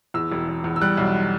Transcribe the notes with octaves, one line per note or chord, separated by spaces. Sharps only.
E2 E6
E1
E1
E2
E6
G3 F#6
B1